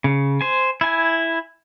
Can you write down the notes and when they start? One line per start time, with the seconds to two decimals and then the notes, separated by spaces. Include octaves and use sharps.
0.04 C#3
0.41 C5 G#5
0.81 E4 G#5